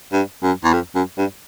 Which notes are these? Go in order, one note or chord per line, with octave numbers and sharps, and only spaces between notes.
G2
F#2
E2
F2
F#2
G2